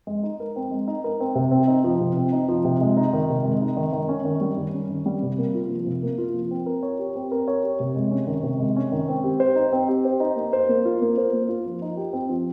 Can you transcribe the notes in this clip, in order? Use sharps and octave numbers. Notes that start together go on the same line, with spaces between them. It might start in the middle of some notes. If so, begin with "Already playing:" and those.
G#3
D#4
A#4
C4
G#3
D#4
A#4
C4
C3
C4
D#4
F3
C3
C4
D#4
F3
C3
G#3
D#4
D#3
C3
G#3
D#4
D#3
D#3
C#4
D#3
G3
D#3
C#4
D#3
G3
C3
A#3
F4
F3
C3
A#3
F4
F3
C4
A#4
C#5
G4
C4
A#4
C#5
G4
C3
G#3
C#4
D#3
C3
G#3
C#4
D#3
C4
G4
C5
D#4
C4
G4
C5
D#4
A#3
C5
A#3
F4
A#3
C5
A#3
F4
F3
D#4
G4
C4
F3